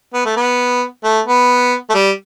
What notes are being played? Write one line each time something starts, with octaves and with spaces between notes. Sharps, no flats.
B3
A3
B3
A3
B3
A3
G3